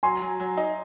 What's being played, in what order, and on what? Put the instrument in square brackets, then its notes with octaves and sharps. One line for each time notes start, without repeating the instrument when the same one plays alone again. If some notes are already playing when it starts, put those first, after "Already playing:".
[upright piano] F#3 [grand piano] G#5 C6
[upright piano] F#3
F#3
D#4